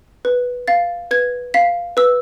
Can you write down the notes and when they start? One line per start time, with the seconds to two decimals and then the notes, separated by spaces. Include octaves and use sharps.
0.25 B4
0.68 F5 A6
1.11 B4 G#6
1.54 F5 B6
1.97 B4 E6